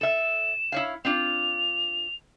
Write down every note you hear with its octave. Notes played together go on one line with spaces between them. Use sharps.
A4 E5 E7
E4 C#5 F5
C4 D4 F4 F7